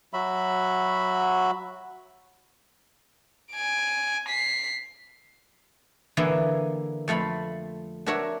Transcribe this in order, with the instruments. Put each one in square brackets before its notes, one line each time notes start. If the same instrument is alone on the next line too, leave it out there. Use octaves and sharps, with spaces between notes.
[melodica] F#3 F#4 E5 B5
[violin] G#5 D7
B6 C7
[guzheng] D3 E3 A#3 E4 G#4
F2 A3 F5 B5
D4 F#4 A#4 C#5 E5